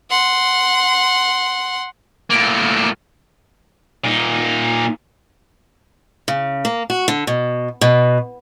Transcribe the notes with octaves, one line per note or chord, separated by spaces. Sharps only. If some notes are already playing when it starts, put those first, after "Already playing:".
F#5 C6
A2 A#3
A#2 D#4
C#3
A#3
F#4
D3
B2
B2